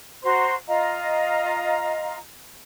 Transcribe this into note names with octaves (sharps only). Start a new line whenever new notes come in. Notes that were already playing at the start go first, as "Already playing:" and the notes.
F#4 C5 A#5 C6
F4 D#5 F5 A#5